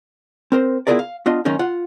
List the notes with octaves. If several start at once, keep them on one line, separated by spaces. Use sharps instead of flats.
C4 A#4 C5
B3 E4 F4 G#4 A#4 D5
F5
B3 D4 F4 D#5
F#2 D#3 A#3 C#4 D#4
F4 F#5